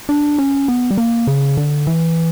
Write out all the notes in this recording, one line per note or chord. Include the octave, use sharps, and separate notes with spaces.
D4
C#4
B3
G3
A#3
C#3
D3
E3